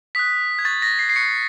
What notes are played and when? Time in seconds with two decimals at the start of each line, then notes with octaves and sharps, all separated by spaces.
0.15 D#6 F#6 B6
0.59 G#6
0.65 C#6 F#6 A6
0.82 A#6
0.99 C7
1.09 C7
1.16 C#6 F#6 C#7